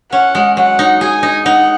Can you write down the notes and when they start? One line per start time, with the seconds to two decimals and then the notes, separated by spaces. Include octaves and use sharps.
0.12 C#4 F#5
0.35 G#3
0.57 F#3 F#5
0.79 D#4
1.01 G#4 G#5
1.23 D#4
1.46 D#4 F#5